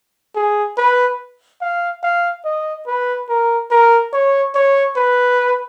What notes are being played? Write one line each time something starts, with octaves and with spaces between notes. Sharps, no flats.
G#4
B4
F5
F5
D#5
B4
A#4
A#4
C#5
C#5
B4